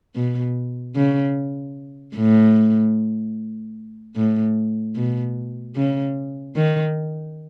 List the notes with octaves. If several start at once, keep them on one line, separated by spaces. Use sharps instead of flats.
B2
C#3
A2
A2
B2
C#3
D#3